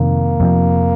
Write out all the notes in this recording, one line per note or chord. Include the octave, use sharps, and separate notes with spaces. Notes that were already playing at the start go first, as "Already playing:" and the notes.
Already playing: F2 C3 D#3 A#3
F2 C3 F3